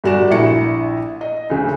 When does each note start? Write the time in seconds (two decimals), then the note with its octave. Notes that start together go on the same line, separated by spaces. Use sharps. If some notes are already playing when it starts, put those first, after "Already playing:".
0.04 G1 G3 F#4 D5 E7
0.30 A#1 E4 C#7
1.21 D#5
1.50 D2 C#3